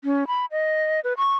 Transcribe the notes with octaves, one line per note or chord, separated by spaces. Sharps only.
C#4
B5
D#5
B4
C#6